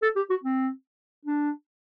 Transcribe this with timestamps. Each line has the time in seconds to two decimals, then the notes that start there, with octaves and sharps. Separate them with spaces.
0.02 A4
0.16 G4
0.30 F#4
0.44 C4
1.25 D4